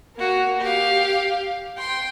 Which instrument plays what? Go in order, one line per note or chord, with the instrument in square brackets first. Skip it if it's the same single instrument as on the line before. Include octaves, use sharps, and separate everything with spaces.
[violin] A#3 F#4
G4 F5
G5 C6